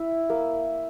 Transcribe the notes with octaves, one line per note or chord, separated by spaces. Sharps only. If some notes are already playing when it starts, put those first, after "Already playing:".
Already playing: E4
A#3